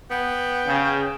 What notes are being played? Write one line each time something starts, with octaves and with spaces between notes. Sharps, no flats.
B3 G5
C#3